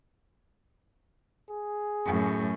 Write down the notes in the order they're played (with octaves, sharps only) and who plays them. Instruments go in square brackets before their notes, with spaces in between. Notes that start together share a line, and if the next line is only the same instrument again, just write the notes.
[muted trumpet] G#4
[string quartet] F#2 A2